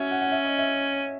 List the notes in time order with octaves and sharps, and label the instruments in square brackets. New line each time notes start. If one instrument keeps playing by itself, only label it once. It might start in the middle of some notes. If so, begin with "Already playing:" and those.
Already playing: [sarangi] C#4 [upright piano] F#4 E5
[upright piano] F#5
F#5
E5
D#5
E5